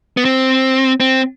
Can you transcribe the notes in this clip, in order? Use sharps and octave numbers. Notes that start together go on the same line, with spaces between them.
B3
C4
C4